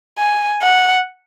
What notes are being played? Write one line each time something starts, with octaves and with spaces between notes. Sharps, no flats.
G#5
F#5